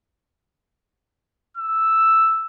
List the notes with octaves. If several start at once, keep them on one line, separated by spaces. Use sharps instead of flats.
E6